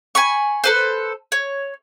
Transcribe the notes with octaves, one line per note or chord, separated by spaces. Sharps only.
G#5 B5 C#6
A4 B4 C5
C#5